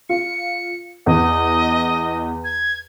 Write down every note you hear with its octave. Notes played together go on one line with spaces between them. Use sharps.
F4 C#7
E2 D#5
G#6